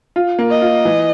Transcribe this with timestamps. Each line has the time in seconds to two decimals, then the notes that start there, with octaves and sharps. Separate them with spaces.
0.16 F4
0.39 A#3
0.50 D#5
0.62 F4
0.85 E3